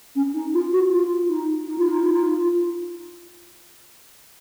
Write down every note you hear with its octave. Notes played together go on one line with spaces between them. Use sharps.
C#4
D#4
F4
F#4
F4
D#4
D#4
F4
D#4
F4
D#4
F4